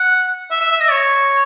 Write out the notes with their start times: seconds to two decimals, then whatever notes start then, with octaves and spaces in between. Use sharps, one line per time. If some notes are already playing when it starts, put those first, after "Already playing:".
Already playing: F#5
0.50 E5
0.61 E5
0.71 E5
0.80 D#5
0.90 C#5